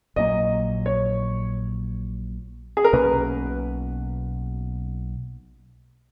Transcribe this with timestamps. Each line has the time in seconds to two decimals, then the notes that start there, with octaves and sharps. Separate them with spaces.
0.16 A#1 A#2 F#3 A#3 D#5
0.86 C#5
2.77 G#4
2.84 A#4
2.93 B1 B2 A#3 C#4 B4